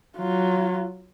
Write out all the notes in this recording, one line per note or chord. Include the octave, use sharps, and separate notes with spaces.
F#3 F4